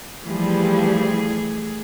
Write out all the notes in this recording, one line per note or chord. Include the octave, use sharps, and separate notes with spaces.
E3 F3 G3 A3 G#4